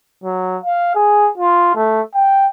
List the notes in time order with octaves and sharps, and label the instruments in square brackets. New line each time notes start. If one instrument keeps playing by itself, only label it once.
[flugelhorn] F#3
F5
G#4
F4
A3
G5